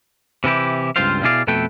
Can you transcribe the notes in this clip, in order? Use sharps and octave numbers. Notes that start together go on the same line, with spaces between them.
C3 E3 E4 G4
C#2 G2 C4 F4 C5 F5
B2 E4 G#4 D5 F5
F2 B2 A3 A4 B4 G5